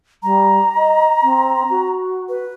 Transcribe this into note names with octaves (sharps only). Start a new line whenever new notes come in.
G3 A#5
D#5
C4
F#4
B4